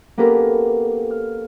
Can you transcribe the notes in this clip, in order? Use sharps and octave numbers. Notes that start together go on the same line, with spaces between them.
A#3 B3 C#4 G4 A4 A#4
F6